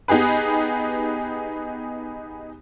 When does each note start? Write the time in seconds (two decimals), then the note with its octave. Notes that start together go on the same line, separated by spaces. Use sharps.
0.08 B3 D#4 G4 G#4 B4